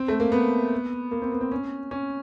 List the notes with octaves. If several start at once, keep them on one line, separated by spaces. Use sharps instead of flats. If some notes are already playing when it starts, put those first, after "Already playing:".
Already playing: C4
A3
A#3
B3
A#3
C4
B3
C4
C#4
C#4